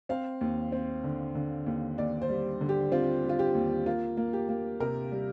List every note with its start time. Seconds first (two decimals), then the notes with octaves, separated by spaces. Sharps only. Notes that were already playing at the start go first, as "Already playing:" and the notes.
0.09 C4 F5
0.41 D#2
0.72 C4
1.04 D3
1.35 D3
1.66 D#2
1.98 D#2 D5
2.22 C5
2.29 G3
2.61 D3
2.69 G4
2.92 C4 F4
3.24 G3
3.29 F4
3.39 G4
3.55 D#2
3.86 A#3 F4
4.17 A#3
4.33 G4
4.49 A#3
4.80 C3 A#4
5.12 G3